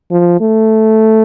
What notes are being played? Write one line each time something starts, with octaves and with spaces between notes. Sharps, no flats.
F3
A3